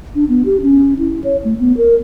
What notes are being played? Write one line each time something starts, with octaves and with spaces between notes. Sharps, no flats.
D4
B3
G4
C#4
E4
C#5
A3
B3
A#4